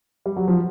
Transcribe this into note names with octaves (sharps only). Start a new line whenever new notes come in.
G3
F#3
F3